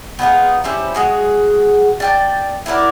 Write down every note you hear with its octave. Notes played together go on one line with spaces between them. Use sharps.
B3 D#4 F4 G#4
G3 C#4 E4 C5
G#3 F#4 G#4
D5 G5 A5
E4 F#4 A#4 D5